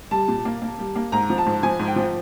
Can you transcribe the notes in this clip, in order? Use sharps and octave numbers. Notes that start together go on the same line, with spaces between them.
G3 A5
A#2
A#3
A#3
G3
A#3
G#2 A#5
F3
A5
G#2
F3 G#5
G#2
G5
F3